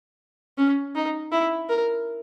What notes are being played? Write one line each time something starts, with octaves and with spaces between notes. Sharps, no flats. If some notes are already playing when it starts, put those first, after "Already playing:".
C#4
D#4
E4
A#4